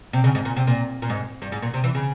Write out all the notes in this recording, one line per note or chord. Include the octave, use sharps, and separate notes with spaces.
C3
C#3
G#2
A#2
C3
A#2
A#2
G#2
G2
G#2
A#2
C3
E3
C#3